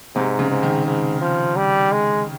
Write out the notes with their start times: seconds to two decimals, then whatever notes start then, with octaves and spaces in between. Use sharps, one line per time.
0.15 G#2 C3
0.39 C#3
0.50 G#2
0.63 D#3
0.87 G#2
1.21 F3
1.56 G3
1.92 G#3